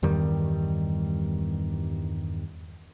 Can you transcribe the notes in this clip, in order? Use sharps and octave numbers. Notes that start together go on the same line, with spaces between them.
E2 G2 D#3 G3